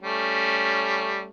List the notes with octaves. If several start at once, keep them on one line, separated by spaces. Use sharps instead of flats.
G3 A3 C#4